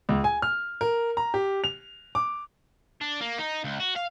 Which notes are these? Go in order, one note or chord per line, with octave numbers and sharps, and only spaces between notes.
C#2
G#5
F6
A#4
A#5
G4
F7
D6
D4
A#3
D#4
C#2
F#4
F5